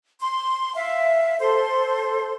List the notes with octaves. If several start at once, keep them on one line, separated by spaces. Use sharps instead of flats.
C6
E5 F5
A4 C5 C6